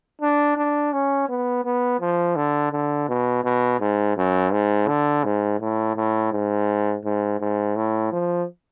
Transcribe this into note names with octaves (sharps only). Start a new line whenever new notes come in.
D4
D4
C#4
B3
B3
F3
D3
D3
B2
B2
G#2
F#2
G#2
D3
G#2
A2
A2
G#2
G#2
G#2
A2
F3